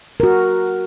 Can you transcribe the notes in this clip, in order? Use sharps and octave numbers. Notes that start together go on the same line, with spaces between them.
F#4 A#4